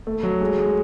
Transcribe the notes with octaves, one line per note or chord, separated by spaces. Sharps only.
A3
F#3
G#3
G#3